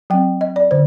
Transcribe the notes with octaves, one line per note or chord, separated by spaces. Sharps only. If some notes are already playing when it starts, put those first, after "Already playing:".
F#3 C4 G5
D#5
D5
D3 C5